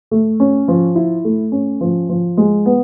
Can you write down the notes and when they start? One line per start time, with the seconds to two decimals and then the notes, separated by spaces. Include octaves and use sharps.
0.11 A3
0.40 C#4
0.68 F3
0.95 E4
1.25 A3
1.52 C#4
1.81 F3
2.09 F3
2.37 G#3
2.66 B3